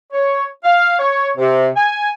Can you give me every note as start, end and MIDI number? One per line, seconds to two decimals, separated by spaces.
0.12 0.45 73
0.64 0.97 77
0.99 1.28 73
1.38 1.67 48
1.76 2.09 80